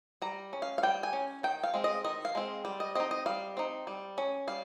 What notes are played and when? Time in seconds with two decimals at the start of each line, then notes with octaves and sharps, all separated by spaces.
0.22 G3 A#5
0.53 C#4
0.62 F5
0.78 F5
0.83 G3 G5
1.03 G#5
1.13 C#4
1.43 D#3 G5
1.63 F5
1.74 G#3 C4
1.84 D#5
2.04 D#3 D#5
2.25 F5
2.35 G#3 C4
2.65 G3
2.80 D#5
2.95 C4 D#4 D#5
3.11 D#5
3.26 G3 F5
3.57 C4 D#4
3.87 G3
4.18 C#4
4.47 G3 F5